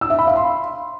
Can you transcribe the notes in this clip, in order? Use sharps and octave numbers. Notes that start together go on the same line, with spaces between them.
E6
E5
B5
F5
C6